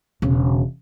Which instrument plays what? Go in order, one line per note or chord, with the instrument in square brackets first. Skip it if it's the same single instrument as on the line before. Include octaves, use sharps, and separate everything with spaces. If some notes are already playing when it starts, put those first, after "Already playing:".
[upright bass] E1 C#3